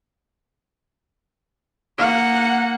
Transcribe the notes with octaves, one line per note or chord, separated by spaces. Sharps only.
A#3 F#5